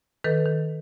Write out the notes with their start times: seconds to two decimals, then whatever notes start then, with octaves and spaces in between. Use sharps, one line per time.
0.24 D#3 A4 B4
0.46 D#3